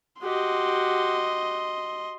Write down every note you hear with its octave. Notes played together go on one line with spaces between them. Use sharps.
F#4 G4 D#5 C6